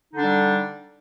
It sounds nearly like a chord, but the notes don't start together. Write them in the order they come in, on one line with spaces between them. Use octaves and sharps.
D#4 D3 D4 G3